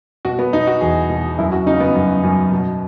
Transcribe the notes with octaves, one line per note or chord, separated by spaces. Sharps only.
B2 F#4
B3
B2 D#4
F#4
E2 G#4
B2
F#2 E4
F#4
C#3 D#4
B3
F#2
F#2
B2